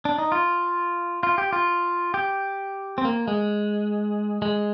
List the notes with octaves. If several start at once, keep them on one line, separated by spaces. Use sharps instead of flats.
D4
D#4
F4
F4
G4
F4
G4
C4
A#3
G#3
G#3